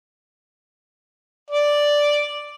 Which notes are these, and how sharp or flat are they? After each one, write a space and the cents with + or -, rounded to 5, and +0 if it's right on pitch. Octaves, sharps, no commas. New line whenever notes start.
D5 +0